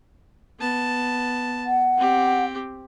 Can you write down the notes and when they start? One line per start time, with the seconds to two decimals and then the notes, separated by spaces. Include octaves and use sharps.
0.60 B3 A5
1.66 F#5
1.98 C4 G4